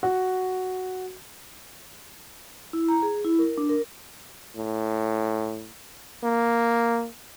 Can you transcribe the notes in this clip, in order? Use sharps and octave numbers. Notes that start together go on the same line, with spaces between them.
F#4
E4
A#5
G#4
E4
A#4
D4
A#4
A2
A#3